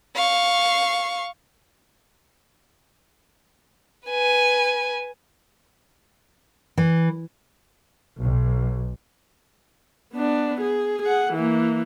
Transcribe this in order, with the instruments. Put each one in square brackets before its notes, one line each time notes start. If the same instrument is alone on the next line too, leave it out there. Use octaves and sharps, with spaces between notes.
[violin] F5 C#6
B4 G#5
[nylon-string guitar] E3
[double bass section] B1
[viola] B3 D4
G#4
G#4 F#5
E3 A#3